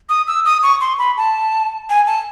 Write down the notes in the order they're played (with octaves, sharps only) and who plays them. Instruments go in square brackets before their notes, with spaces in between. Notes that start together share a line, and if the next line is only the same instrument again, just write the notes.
[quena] D#6
E6
D#6
C#6
C6
B5
A5
G#5
A5